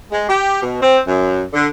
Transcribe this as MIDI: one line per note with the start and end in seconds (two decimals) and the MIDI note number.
0.11 0.29 56
0.29 0.60 67
0.63 0.78 47
0.82 0.99 60
1.07 1.44 42
1.53 1.67 50